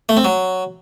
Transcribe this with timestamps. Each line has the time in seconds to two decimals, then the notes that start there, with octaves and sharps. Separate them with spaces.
0.09 A3
0.17 C4
0.24 F#3